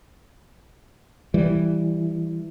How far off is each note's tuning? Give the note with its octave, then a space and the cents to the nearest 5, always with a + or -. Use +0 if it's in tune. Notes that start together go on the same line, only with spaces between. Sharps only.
E3 +0 G3 +0